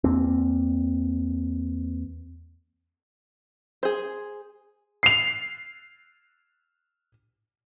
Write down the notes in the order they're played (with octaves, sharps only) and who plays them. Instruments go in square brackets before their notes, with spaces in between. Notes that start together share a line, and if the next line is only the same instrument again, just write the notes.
[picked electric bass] E2 A#3 C4
[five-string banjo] G#4 C5
[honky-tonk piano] C7 F7